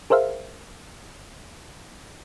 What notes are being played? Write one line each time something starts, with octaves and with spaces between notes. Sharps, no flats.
G#4 A#4 C5 E5 F5